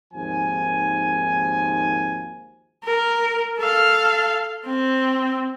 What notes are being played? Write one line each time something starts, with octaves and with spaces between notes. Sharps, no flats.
G#1 D#2 F3 G#5
A#4
A4 F5
C4